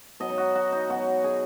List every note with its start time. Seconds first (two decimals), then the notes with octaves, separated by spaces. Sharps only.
0.20 B2 F#3 D#5
0.29 D#4
0.38 F#4
0.55 F#4
0.72 D#4
0.90 B2 F#3 F#4
1.24 G#4